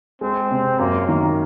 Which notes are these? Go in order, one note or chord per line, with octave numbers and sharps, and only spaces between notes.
G#3 C4
C3
F#2 A#3
D#3 A#3